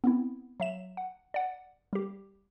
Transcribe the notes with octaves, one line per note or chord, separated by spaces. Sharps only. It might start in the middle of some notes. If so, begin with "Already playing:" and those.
B3 C4 E4
F#3 E5 E7
F#5
D5 F#5
G3 G4